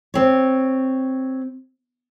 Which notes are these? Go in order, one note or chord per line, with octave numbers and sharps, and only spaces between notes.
C4 C#5